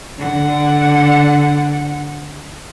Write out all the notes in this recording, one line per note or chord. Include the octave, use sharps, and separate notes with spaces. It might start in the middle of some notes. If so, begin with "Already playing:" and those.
D3 F#5